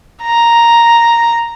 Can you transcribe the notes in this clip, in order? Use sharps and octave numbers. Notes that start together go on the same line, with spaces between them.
A#5